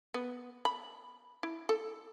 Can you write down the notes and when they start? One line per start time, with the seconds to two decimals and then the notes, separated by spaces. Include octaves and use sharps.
0.14 B3
0.65 B5
1.43 E4
1.69 A4